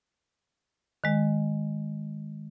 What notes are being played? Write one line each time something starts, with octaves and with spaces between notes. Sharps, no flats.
D#3 G#3